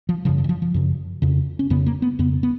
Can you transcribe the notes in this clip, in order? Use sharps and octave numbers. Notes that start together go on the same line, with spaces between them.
F3
F#2 C#3 F3
F3
D#3
F3
F3
F#2 C#3
F2 C#3
C#4
F2 C#3 B3
A#3
B3
F2 C#3 B3
B3